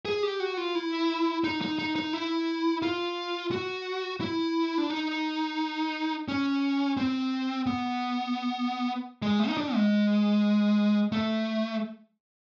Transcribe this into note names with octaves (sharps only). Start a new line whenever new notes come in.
G#4
G4
F#4
F4
E4
D#4
D#4
D#4
D#4
E4
F4
F#4
E4
D4
D#4
C#4
C4
B3
G#3
A3
D#4
D4
G#3
A3